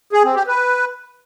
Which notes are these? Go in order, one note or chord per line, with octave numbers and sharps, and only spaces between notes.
G#4
C4
G4
B4